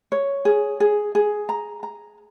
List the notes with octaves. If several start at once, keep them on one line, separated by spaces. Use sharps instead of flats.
C#5
G#4
G#4
G#4
A#5
A#5